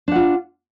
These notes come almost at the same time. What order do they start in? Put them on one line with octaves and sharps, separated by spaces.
D4 F#5 F4